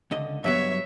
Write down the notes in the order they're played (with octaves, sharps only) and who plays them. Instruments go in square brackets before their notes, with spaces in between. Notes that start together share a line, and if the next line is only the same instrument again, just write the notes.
[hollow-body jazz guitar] C#2 D3 D#5
[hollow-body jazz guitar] G2 F#3 B3 [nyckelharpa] C#5 E5